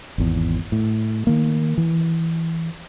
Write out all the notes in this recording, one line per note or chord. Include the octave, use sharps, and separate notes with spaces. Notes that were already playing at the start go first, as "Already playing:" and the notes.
G#1 E2
A2
D#3 A#3
E3